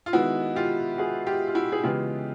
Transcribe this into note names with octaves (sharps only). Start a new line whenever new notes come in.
F4
D#3 G#3 B3 E4 F#4
F4 G4
F#4 G#4
F4 G4
F4
E4 F#4
G#4
C#3 E3 G#3 B3 F4 G4